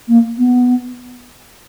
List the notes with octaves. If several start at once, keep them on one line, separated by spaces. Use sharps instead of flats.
A#3
B3